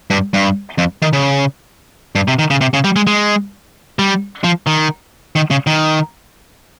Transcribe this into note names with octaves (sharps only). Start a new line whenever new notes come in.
G2
G2
F2
D#3
C#3
G2
C3
D#3
C#3
C3
C#3
G3
G#3
G#3
G3
F3
D#3
D#3
C#3
D#3